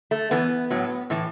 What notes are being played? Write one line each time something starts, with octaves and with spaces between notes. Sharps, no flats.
A3
E2 E3 B3
A2 F#3
A2 E3